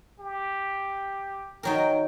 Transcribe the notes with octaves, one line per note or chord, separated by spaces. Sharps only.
G4
D#3 F#3 A#4 G5